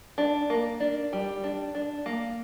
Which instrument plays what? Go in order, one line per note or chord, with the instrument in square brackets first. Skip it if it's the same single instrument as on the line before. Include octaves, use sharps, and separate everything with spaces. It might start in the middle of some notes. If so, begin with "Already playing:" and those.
[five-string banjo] D4
A#3
D4
G3
D4
D4
A#3